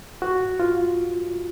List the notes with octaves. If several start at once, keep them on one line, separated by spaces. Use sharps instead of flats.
F#4
F4